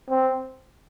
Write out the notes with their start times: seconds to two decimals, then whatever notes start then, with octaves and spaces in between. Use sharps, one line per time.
0.10 C4